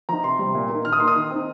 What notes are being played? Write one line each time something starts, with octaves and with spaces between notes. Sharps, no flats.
F3 D#4 A#5
C3 C6
G3 C4
A#2
A#3
D#4
D#3 F6
D#6
A#3 D#4 C6
D#6
D#3
C4 D#4